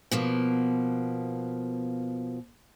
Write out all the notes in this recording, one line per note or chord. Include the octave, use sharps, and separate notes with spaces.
B2 F3 A#3